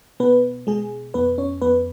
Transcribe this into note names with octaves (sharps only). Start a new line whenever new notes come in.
B2 B3 B4
B2 G#3 G#4
F2 B3 B4
C#4 C#5
F2 B3 B4